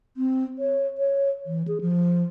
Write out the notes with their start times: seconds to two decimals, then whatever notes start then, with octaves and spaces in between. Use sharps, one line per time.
0.17 C4
0.59 C#5
0.98 C#5
1.46 E3
1.68 G#4
1.81 F3